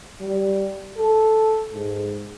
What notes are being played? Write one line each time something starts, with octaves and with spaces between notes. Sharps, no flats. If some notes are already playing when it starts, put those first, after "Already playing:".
G3
A4
G#2